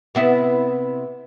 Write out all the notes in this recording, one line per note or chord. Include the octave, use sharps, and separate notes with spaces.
C3 B3 E4